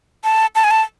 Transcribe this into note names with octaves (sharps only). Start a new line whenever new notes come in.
A5
A5
G#5
A5